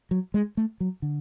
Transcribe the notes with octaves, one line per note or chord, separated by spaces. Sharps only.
F#3
G#3
A3
F#3
D3